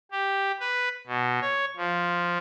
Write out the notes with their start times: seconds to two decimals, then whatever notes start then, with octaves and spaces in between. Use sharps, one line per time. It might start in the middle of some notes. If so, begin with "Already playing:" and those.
0.12 G4
0.60 B4
1.07 B2
1.41 C#5
1.77 F3